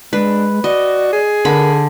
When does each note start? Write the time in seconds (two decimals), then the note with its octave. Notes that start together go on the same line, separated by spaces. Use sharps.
0.13 G#3 D4 B4
0.64 F#4 D5 D#5
1.13 G#4
1.45 D3 A#4 B5